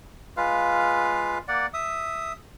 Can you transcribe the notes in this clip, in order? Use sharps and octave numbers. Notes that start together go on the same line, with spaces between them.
G#3 F4 B4 F5
A#3 D5 F#5
E5 D#6